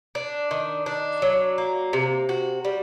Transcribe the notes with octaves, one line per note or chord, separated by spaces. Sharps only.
D4
D#3
D4
F#3
A#3
C3
F#4
G3